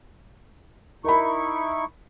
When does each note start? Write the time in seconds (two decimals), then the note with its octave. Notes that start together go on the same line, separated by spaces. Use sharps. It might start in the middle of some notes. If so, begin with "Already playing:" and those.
1.04 D#4 E4 A#4 B5 C#6